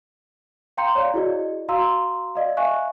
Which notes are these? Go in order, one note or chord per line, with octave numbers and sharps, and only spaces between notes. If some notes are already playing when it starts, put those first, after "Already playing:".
F5 G5 A#5 C6 G6 C#7
C#5 D5 F5 A#5
E4 F#4 G#4 D5 D#5
F#4 F5 A#5 C6 E6
D5 D#5 F5
E5 F5 G#5 C#6 F#6